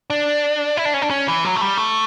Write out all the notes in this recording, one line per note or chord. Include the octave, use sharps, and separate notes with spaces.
D4
E4
D4
C#4
D4
C#4
E3
F#3
A3
G3
A3